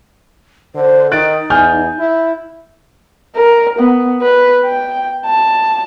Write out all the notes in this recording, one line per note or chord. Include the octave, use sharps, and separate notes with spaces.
D3 C5
D#3 D#4 F#6 A6 D7
E2 G#5 F6 G6
E4
A#4
B3
B4
G5
A5